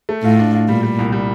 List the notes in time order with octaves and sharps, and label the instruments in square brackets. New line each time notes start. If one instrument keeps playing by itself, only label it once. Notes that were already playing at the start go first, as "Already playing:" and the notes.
[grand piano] A3
[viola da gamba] A2 [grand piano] F4
[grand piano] D4
F4
[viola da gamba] A#2 [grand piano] G3
[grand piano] G3
C2
G3